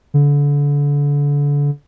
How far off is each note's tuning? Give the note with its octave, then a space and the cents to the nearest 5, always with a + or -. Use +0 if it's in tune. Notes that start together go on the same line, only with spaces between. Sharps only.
D3 -30